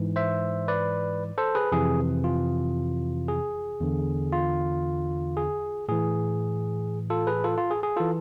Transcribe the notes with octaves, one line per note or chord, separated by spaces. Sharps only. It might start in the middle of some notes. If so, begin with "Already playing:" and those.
Already playing: G#2 E3
C5 E5
B4 D5
A4 C5
G#4 B4
F2 C3 E3 G#4
F4
G#4
E2 D3
F4
G#4
A2 E3 G#4
F4 A4
G#4 B4
F4 A4
F4
G#4
G#4
E3 F4 A4